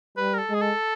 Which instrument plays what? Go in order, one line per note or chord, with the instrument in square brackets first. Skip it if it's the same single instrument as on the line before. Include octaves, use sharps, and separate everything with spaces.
[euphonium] G3 [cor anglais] B4
[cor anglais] A#4
A4
[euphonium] G#3 [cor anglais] G#4
[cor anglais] A4